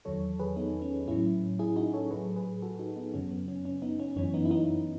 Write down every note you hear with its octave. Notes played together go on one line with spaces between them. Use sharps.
E2 D#3 F#3 A4 C#5
G#4 B4
B3 D#4
C#4
A2 F#3 C#4 E4
E4 G#4
D#4 F#4
A4 C#5
A2 F#3 G#4 B4
G#4 B4
F#4 A4
D#4 F#4
B3 D#4
F#2 C#3 F#3 C#4
B3
C#4
C#4
B3 D#4
C#4
F#2 E3 C#4
B3 D#4
E4
B3 D#4